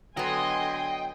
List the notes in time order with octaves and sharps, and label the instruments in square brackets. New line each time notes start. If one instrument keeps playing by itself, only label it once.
[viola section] D3 G#5 C6 [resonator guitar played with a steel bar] F#3 B3 [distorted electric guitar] D#5 [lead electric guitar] G5